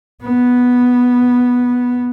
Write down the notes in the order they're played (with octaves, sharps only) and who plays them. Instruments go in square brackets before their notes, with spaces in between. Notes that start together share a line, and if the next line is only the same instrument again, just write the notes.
[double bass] B3